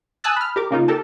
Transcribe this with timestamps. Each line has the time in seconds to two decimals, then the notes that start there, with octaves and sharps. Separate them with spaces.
0.24 G#5 A5 D#6 E6 F#6 A6
0.36 B5 F6
0.56 G4 A#4 D6
0.71 C#3 A#3 D#4 F4
0.88 G4 A4 A#4 G5 A5